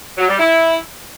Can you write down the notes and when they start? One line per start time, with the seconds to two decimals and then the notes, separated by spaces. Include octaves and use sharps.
0.18 F#3
0.28 G3
0.39 E4